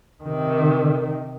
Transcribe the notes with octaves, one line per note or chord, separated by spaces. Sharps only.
C3 D#3